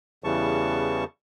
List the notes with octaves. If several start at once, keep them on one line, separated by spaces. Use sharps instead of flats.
E2 C#3 E3 G3 A5 C#6